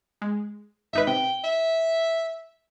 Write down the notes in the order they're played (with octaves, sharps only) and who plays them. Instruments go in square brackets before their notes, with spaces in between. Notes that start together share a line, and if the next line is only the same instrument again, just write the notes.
[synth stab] G#3
[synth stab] G#1 D#4 B4 [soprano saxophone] E5
[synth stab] C3 [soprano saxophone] G5
[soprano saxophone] E5